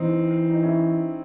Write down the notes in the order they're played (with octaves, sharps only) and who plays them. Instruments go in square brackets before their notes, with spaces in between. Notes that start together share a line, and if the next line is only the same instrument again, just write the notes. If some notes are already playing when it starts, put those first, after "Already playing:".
Already playing: [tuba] E3 [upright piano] C4 D#4
[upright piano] D#4
C#4 E4